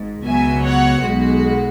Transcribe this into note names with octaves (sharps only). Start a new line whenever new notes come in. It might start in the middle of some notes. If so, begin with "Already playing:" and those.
Already playing: G#1 G#2
C#2 B2 F#3 E5 G#5
C#5 F#5
B1 B2 G#3 F#4